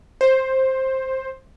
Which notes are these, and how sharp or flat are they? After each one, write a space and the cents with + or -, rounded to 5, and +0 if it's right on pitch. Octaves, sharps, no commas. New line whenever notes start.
C5 +10